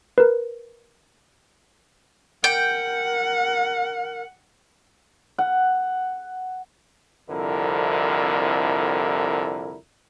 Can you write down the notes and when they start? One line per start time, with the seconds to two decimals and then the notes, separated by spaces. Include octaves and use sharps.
0.18 A#4 B4
2.44 A#4 F#5 G5
5.38 F#5
7.30 C2 F2 D3 E4 A#4